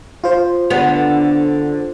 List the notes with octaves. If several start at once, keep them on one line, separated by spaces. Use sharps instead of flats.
F4 C5
D3 B3